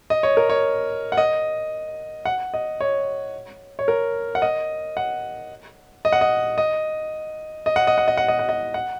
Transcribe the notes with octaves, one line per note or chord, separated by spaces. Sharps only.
D#5
C#5
A#4
C#5
F#5
D#5
F#5
D#5
C#5
C#5
A#4
F#5
D#5
F#5
D#5
F#5
D#5
D#5
D#5
F#5
D#5
F#5
D#5
F#5
D#5
F#5
D#5
F#5